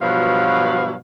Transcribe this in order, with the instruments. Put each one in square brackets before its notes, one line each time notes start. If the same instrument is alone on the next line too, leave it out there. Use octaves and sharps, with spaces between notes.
[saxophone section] G2 B2 F3 F#3 F5